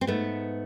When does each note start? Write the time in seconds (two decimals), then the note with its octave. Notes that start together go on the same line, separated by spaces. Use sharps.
0.01 C4
0.07 G#2 A3 B3